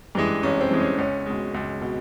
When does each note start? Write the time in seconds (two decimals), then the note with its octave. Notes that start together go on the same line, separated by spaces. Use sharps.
0.15 G2 E3 G#3
0.43 A1 C#4
0.61 C4
0.71 G2 E3 G#3
0.80 C#4
0.98 C#2 C#4
1.26 B2 G#3
1.54 C#2
1.82 B2